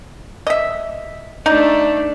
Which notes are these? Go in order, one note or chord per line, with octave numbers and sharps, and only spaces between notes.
D#5 E5
A3 D4 D#4